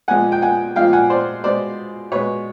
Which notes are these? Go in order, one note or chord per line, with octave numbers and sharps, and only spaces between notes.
A#2 F3 G#3 F#5 G#5
G5
F#5 G#5
A#2 F3 G#3 F5 G5
F#5 G#5
C5 D5
B2 G#3 C5 D5
B2 G#3 B4 C#5